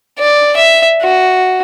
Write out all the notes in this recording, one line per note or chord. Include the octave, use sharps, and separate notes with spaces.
D5
E5
F#4